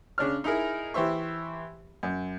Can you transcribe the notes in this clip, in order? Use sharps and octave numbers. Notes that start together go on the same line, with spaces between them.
C#3 D4 C#5 F6
D#4 E4 G#4 A#4
E3 G4 C5 E5 C#6
F#2